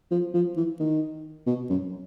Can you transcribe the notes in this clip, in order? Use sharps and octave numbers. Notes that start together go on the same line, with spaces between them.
F3
F3
E3
D#3
B2
F#2